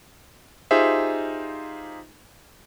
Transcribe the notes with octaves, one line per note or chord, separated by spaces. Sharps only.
D#4 F4 G4 G#4 C5 E5